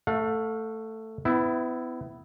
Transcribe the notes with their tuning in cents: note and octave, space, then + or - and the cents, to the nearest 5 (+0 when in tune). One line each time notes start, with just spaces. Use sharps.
A3 +10 F5 +45
B3 +35 E4 +0